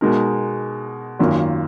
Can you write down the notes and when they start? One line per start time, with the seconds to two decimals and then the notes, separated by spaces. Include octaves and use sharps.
0.01 B2 G#3 D#4 A#4
1.19 G#1 F#2 D#3 A#3 F4